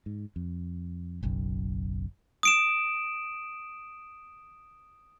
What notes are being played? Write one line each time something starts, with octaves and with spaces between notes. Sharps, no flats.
G#2
F2
F#1 B1 F#2
D#6 D7 E7